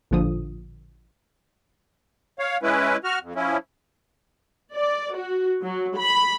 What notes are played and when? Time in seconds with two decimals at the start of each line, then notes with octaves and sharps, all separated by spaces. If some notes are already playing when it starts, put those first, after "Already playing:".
0.11 A1 A#2 D3 F3 D#6
2.39 C#5 F5
2.63 G#3 C#4 E4 B4
3.04 F#4 F6
3.23 F2
3.36 F3 C#4 E4
4.74 D5
5.16 F#4
5.63 F#3
5.97 B5